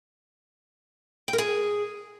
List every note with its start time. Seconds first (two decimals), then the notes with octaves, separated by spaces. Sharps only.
1.28 G5
1.33 A#4
1.38 G#4